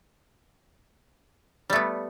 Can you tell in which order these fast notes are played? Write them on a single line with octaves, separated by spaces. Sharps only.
G3 A3 B3